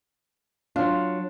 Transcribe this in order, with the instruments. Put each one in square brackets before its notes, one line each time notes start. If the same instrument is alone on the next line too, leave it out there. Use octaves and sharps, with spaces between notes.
[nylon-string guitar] F#3 F4 [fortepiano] D4